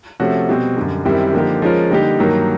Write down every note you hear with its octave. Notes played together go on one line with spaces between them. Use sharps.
C3 F3 A3 C#4 F#4
B2 G3 C4
F#2 D3 G3
F#2 D#3 G3 C4 E4
D3 F3 A#3 D#4 G4
F3 G#3 C#4 F4 A#4
D3 G3 A#3 D#4 G4
G2 D#3 F#3 A#3 D#4